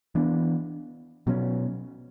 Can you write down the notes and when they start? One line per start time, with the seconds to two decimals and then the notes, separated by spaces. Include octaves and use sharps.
0.15 E3 B3 D4
1.27 B2 F#3 C#4